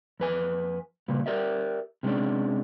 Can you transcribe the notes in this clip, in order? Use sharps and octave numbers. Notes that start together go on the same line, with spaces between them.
F2 B4 G#5
C2 A#2 C#3 G3
G4 A#4 D5 E5
C3 G3 G#3 C#4 D4